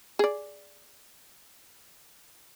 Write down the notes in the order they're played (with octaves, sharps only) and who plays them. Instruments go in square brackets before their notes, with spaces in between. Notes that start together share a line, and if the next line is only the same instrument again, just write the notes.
[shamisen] G#4 D5